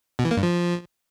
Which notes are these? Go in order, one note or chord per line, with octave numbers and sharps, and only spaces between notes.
B2
E3
A#3
G2
F3